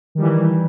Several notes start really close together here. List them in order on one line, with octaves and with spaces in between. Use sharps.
D#3 G3 E3